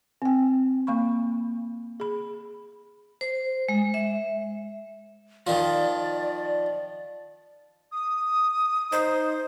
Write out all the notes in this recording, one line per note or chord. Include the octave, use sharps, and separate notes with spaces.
C4 G5
A#3 F5 B5 C#6
G#4 B5
C5
G#3
E5
D#3 F3 D5
D#6
D#4 C5